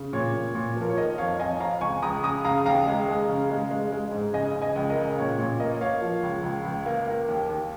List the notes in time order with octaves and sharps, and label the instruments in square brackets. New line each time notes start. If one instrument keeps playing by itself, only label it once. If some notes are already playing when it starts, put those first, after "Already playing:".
Already playing: [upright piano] C#3
A#2 C#5
A#2
A#2
F3
A#4
C#5
D#3 A#4 D#5
F2 C#5 F5
F2 D#5 G#5
F2 F5 A#5
C#2 G#5 C#6
C#2 A#5 D#6
C#3 A#5 D#6
C#3 F5 A#5
D#2 F5 A#5
G#3
G#3
C#3
G#3
G#3
G#3
G#2
C#3 D#5 G#5
C#3
D#5 G#5
C#2
A#4 D#5
C#3
A#2 C#5
A#2 C#5
A#3 A#4 D#5
A#3 C#5 F5
F3
C#2
C#2
C#2
A#3
A#3
D#2
D#2